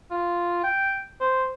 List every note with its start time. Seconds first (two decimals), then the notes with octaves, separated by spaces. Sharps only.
0.11 F4
0.63 G5
1.21 C5